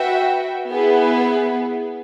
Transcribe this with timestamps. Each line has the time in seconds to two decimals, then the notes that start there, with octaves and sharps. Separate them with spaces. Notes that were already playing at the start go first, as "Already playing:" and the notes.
Already playing: F#4 B4 E5 G5
0.71 B3 E4 G#4 B4